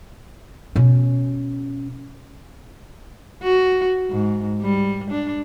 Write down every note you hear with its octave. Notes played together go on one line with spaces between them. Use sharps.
B2 C#4
F#4
G#2
G3
D4